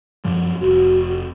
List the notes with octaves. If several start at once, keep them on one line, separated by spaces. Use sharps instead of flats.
F#2 F3 G3
F1 F#4